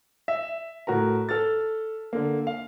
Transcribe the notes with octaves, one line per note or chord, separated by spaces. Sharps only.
E5
A2 F#4 A#4 A#5
A4 F6 A6
D3 A#3
F5